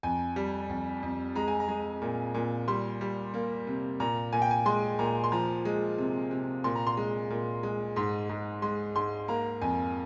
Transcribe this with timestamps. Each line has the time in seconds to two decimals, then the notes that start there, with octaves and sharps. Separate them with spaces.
0.03 F2 G#5
0.36 G3
0.69 F2
1.03 F2
1.35 G#3 A#5
1.48 G#5
1.60 A#5
1.68 G#3
2.02 A#2
2.34 A#2
2.68 G3 C6
3.01 G3
3.34 A#3
3.67 C3
4.00 A#2 A#5
4.33 A#2 G#5
4.42 G5
4.51 G#5
4.66 G#3 C6
4.99 A#2 A#5
5.24 C6
5.32 F3 A#5
5.65 G#3
5.98 C3
6.31 C3
6.64 A#2 C6
6.76 A#5
6.87 C6
6.97 G#3
7.30 A#2
7.63 G#3
7.96 G#2 C6
8.29 G#2
8.62 G#3 C6
8.95 G#2 C6
9.28 A#3 A#5
9.62 F2 G#5